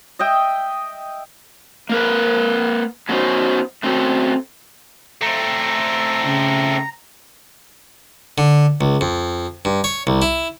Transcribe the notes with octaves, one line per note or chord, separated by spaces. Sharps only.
D#5 E5 G5
A#3 A#4 B4
F#3 B3 C#4 D#4 F#4 C5
A3 C4 C#4 F#4 A4
A3 C4 A#5
C#3
D3
C#2
F2
G2
C#5
C2
E4